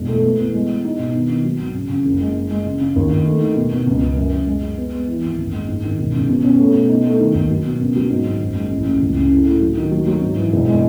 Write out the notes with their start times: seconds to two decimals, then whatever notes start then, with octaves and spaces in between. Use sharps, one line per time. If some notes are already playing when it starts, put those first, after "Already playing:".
Already playing: E1
0.09 A3
0.23 B3
0.39 E2
0.54 G#3
0.69 G#3
0.85 D#4
0.99 B2
1.15 D#3
1.30 D#3
1.45 F#3
1.59 G#1
1.75 C#3
1.90 C#3
2.05 F#1
2.21 G#3
2.35 G#3
2.51 G#3
2.66 C#3
2.81 C#3
2.96 D#2
3.11 D#3
3.26 A3
3.42 D#3
3.56 B2
3.72 B2
3.87 C#2
4.02 C#3
4.17 F#2
4.32 F#2
4.47 G#3
4.62 G#3
4.78 B3
4.93 G#3
5.08 E3
5.23 G#1
5.38 F#1
5.53 G#3
5.68 G#2
5.84 D#3
5.98 E1
6.14 C#3
6.29 B2
6.44 C#4
6.59 A3
6.74 B2
6.89 D#4
7.05 A3
7.20 D#3
7.34 D#2
7.50 F#3
7.65 B2
7.80 C#3
7.96 F#3
8.10 G#2
8.25 G#1
8.40 F#1
8.56 G#3
8.70 A1
8.86 A1
9.01 C#2
9.16 C#3
9.31 A2
9.46 A2
9.61 F#3
9.77 D#3
9.91 F#3
10.07 F#3
10.22 G#2
10.37 E3
10.53 E1
10.68 G#3